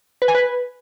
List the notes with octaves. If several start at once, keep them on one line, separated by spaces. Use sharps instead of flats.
B4
G#5
B4